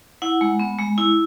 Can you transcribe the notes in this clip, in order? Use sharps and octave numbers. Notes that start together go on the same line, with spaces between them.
E4 F#5
G#3
B3
G#3
E4